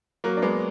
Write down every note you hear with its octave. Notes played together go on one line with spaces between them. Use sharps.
F#3 A#3
D4
G#3 B3